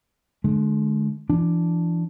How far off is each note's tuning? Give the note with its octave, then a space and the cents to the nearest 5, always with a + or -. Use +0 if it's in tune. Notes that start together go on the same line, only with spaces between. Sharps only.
D3 +20 G#3 +35
E3 +35 D4 +0